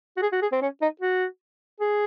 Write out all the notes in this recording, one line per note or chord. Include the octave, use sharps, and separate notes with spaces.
F#4
G#4
F#4
G#4
C4
C#4
D#4
F#4
G#4